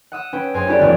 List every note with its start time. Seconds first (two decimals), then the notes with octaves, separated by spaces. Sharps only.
0.12 F#5 D#6 E6
0.33 C#4 B4 G5
0.54 F#2 G#4 C5 G#5
0.67 C#4 E4 F#4 G4 A4 D5
0.79 A1 F2 D#3 G3 B3